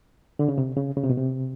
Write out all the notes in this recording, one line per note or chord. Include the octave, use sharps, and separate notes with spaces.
D3
C#3
C3
C#3
C#3
C3
B2
C3